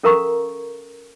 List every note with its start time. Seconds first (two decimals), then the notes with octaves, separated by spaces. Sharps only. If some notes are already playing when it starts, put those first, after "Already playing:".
0.03 C#4 A4 A#4 F5 A#5 C#6